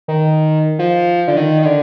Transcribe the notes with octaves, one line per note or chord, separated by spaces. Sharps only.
D#3
F3
D3
D#3
D#3
D3